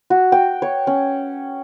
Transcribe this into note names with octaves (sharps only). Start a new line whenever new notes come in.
F#4
G5
C#5
C#4